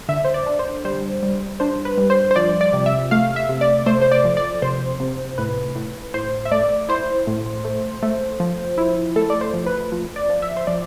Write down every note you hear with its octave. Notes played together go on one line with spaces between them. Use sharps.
D3 E5
C5
D5
D4
C5
G3 C5
G3
D4 C5
B4
G3
C5
C5
F3 D5
D5
C3
E5
A3 F5
E5
C3
D5
A3 C5
C5
D5
F3
D5
C3 C5
C3
A2 B4
A2
A2 C5
E5
A3 D5
E4 C5
A2
A3
A3
F3
E4
A3 A4
D5
C5
F3
B4
F3
D5
F3
E5
C5
F3 D5